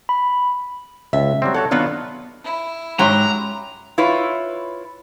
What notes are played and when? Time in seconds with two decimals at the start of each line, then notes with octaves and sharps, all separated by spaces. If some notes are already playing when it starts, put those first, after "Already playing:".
0.09 B5
1.13 C#2 E5
1.42 F#3 G3 C4
1.54 F#4 A4 C#5 F#5
1.71 D#3 F#3 B3 D4 F4 F#5
2.44 E4
2.99 G#2 F#3 C#4 F#4 G4 A#5 C6
3.98 E4 F4 B4 C#5